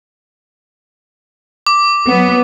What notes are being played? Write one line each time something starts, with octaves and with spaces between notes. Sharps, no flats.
D6
F#3 B3